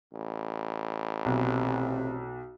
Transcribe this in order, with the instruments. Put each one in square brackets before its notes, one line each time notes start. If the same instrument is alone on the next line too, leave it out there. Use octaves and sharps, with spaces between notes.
[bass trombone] A1
[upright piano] B1 [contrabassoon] C3